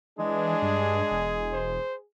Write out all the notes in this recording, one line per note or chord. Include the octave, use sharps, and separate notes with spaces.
E3 G#3 D4 G#4
G2
E1
C5